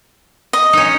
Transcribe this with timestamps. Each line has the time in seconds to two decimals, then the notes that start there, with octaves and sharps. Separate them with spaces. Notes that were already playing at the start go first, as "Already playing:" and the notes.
0.53 D#5
0.73 C#4 D#4